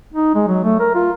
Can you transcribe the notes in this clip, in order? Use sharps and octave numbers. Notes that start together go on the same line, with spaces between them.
D#4
G#3
F#3
A3
A#4
F4